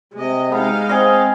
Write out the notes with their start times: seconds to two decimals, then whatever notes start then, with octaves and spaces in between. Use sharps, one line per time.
0.14 C3 G#3 D#5
0.52 G#3 B3 D#4 F5
0.89 C4 G#4 D#5